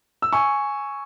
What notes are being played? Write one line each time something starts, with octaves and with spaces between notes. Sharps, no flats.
E6
G#5 C#6